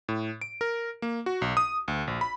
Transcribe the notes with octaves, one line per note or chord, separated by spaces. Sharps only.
A2
D7
A#4
A#3
F#4
B1
D#6
D2
A#1
B5